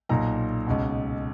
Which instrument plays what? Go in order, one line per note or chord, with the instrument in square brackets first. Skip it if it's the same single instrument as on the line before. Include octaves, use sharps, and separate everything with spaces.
[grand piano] B1 A#2 A#5
C#2 B2